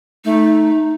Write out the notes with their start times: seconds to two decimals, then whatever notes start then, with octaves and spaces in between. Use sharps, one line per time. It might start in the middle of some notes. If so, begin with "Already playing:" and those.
0.25 A3 D#4